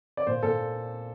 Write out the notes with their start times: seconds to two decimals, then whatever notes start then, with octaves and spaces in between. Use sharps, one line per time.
0.17 D5
0.27 A#2 C5
0.43 A#2 A4